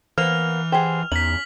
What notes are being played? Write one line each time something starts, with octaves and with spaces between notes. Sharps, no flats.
E3 A#3 B3 C5 F6 F7
G4 G#4 C5 F#5
E2 C#4 D#4 B6 F#7